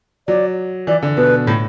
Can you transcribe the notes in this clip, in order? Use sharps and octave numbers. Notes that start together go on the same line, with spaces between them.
F#3 D5
E3 D5
D3
B2 B4
A2